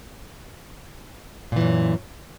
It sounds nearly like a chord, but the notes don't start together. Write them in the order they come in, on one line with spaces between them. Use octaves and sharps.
A#2 E3 F#2